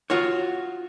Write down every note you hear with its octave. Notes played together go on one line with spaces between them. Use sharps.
F4 F#4 C#5